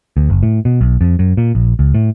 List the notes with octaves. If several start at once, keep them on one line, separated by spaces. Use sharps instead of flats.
D2
F#1
A2
B2
B1
F2
F#2
A#2
A#1
C#2
A2